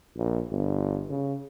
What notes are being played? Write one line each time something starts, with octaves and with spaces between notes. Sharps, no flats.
A#1
G1
C#3